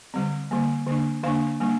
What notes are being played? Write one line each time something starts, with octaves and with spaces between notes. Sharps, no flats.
D3 G3 C4
D3 G3 A#3
D3 A#3 D4
D3 A#3 D4 F5
G3 A#3 D4